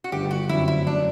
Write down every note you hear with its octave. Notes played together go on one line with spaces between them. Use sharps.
F#4
G1 G4
F#4
F#2 D3 F#3 C4 E4
E4
F#2 D4